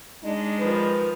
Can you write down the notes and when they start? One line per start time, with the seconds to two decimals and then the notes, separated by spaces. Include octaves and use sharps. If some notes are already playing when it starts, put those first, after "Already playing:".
0.24 G#3 D4 D#4 D#5
0.59 D#3 F3 B4